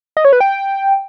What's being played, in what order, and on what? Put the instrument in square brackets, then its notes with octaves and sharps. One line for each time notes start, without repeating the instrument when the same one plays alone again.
[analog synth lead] D#5
C#5
B4
G5